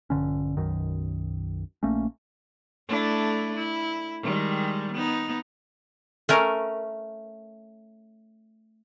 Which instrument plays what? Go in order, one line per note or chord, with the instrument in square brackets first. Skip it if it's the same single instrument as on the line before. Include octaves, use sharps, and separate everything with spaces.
[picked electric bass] A#1 G2 D3 C#4
B1 F#2 D#3
A#1 A3 A#3 C#4
[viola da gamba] A3 D4 E4
E4
D#3 G3 G#3
B3 D#4
[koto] A3 C#4 A#4